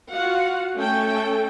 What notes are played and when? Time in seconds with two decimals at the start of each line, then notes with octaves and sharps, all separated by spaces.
0.11 F4 F#4 F5 F#5
0.76 A3 C#4 A4 G5